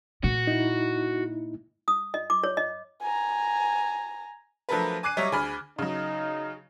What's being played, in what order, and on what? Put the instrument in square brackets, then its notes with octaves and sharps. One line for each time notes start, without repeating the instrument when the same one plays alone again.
[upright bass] A#2 [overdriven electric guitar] F#4
[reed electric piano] D#4 E4
[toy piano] D#6
D#5
D6
C#5
D#5
[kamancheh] G#5 A#5
[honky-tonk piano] F3 F#3 A3 D4 A#4 B4
G#5 D6 F#6 C7 D#7
F#3 G3 C#5 D#5 E5
D2 G#4 G#5 B5 F6
[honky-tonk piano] C#3 F#3 [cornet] D#4